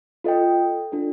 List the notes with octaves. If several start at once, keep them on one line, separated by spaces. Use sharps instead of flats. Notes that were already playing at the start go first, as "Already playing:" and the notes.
F4 A4 D#5 G5
D4 F4 A4